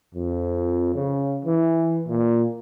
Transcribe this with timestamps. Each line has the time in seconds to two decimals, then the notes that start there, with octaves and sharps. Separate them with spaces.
0.15 F2
0.95 C#3
1.44 E3
2.09 A#2